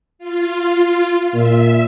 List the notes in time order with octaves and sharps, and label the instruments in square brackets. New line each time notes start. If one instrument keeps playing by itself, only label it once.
[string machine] F4
[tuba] A#2 [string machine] E5